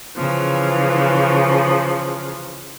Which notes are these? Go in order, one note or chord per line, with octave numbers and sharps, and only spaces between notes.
C#3 E3 F3